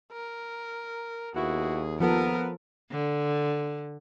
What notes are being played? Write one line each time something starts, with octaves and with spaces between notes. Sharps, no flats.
A#4
D#2 B3 E4 F#4 G#4
F3 B3 A4 A#4
D3